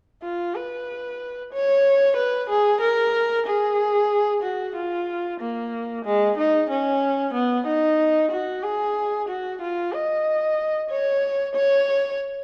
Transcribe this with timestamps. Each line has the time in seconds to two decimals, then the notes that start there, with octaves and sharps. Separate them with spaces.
0.23 F4
0.55 B4
1.52 C#5
2.17 B4
2.50 G#4
2.81 A#4
3.47 G#4
4.43 F#4
4.75 F4
5.40 A#3
6.05 G#3
6.37 D#4
6.70 C#4
7.34 B3
7.67 D#4
8.31 F#4
8.64 G#4
9.28 F#4
9.61 F4
9.93 D#5
10.90 C#5
11.55 C#5